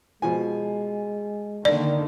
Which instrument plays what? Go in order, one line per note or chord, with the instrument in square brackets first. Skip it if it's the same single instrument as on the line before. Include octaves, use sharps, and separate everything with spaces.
[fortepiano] B2 F3 G#5 [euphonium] G#3
[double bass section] D3 D#3 A#3 [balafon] D5